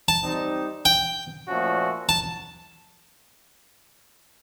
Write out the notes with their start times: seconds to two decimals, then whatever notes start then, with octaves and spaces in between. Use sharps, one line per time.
0.08 A5
0.24 G3 C4 D#4
0.85 G5
1.47 A#2 F3 A3 C#4 F#4
2.09 A5